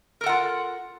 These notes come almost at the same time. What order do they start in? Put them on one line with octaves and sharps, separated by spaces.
A#4 A4 F#5 F4